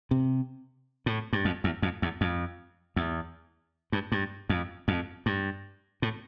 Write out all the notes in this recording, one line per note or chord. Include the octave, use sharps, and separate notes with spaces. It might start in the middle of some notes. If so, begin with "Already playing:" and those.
C3
A2
G2
F2
E2
F2
E2
F2
E2
G2
G2
F2
F2
G2
A2